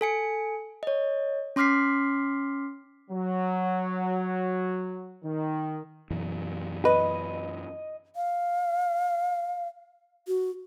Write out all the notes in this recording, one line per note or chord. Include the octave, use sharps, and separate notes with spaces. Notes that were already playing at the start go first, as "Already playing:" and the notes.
A4 G#5 C#7
C#5 D#5
C#4 C6 D6 F6 B6 C7
F#3
D#3
F#2 B2 E3
B4 D#5
F5
F#4